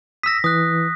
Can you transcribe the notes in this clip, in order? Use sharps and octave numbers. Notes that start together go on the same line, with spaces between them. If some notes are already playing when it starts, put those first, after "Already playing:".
D#6 E6 A#6 B6
E3 D#6 F#6